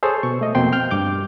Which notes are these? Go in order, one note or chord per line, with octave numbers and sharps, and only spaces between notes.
G#4 A4 C5 C#5
B2 C#6
A3 D#5
F2 B2 A#3 C4 G5 C6
G5 F6 G6
G2 D6 G6